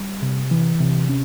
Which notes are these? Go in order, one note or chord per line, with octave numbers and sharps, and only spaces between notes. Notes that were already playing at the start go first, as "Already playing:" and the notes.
Already playing: G3
C3
E3
C3
C#4